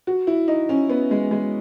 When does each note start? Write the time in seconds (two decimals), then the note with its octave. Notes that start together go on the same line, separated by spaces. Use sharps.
0.07 F#4
0.27 E4
0.48 D#4
0.69 C#4
0.90 B3
1.11 G#3
1.31 G#3